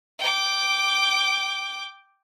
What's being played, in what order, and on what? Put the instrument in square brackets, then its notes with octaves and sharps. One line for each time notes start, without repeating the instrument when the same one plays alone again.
[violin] G5 D6